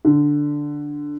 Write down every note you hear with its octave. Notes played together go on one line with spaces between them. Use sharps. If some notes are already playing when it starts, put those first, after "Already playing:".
D3